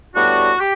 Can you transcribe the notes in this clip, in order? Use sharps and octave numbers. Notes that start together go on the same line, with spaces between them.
A2 G3 B3 D4 F#4
G4